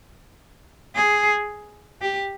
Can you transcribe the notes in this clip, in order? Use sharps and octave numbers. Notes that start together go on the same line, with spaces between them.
G#4
G4